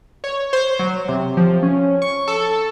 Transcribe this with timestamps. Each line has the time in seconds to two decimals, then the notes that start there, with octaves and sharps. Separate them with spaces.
0.24 C#5
0.53 C5
0.79 F#3
1.08 C3
1.37 F3
1.63 C#4
2.02 C#6
2.28 A4